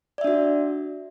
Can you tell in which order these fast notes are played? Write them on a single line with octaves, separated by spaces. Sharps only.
D5 E5 D4 F#4